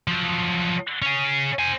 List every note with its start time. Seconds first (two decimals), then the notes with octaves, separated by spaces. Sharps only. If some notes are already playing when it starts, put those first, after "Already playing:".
0.08 F3 F#3
1.02 C#4 G#4
1.59 C5 G#5